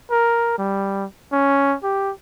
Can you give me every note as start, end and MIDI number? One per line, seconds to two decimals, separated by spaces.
0.11 0.55 70
0.58 1.05 55
1.32 1.76 61
1.84 2.12 67